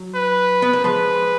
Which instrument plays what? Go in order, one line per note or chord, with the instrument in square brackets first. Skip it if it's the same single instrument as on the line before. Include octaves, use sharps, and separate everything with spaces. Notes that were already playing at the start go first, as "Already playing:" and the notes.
Already playing: [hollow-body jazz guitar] F#3
[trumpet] B4
[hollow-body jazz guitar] B3
A#3
[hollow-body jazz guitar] F3 G#3 [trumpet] B4